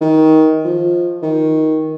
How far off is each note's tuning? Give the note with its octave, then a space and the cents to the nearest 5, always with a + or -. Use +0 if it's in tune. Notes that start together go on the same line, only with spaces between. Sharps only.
D#3 +20
F3 +5
D#3 +15